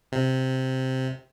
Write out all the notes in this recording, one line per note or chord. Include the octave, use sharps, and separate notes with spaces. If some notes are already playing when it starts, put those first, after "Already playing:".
C3